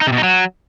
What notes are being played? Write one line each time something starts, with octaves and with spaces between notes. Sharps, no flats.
D#4
C3
B2
D#4
F#3